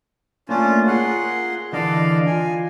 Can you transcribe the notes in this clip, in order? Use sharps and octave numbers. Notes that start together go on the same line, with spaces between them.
A3 A#3 C#4 D4 F4
F4 G#4 A#4 F#5 C6
D3 E3 A4 D5 D#5 F5
F4 G#5